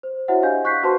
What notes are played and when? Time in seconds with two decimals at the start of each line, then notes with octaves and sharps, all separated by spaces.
0.03 C5
0.28 E4 F#4 C5 C#5 E5 F#5
0.43 D4 G4 D#5 F5 G#5 G6
0.65 C#6 F#6 G6 B6 C7
0.83 F#4 B4 C5 A5 C6 C#6